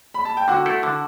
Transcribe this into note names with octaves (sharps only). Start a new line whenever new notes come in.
B5
A5
G5
D3 F#4 F#5
A3 E4 A4
D3